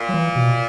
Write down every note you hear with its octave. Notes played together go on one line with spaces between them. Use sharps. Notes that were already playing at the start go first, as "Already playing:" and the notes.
Already playing: A#2
F#3
E3
B2